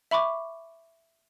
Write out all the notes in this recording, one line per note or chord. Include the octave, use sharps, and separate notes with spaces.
E5 B5 C#6 D6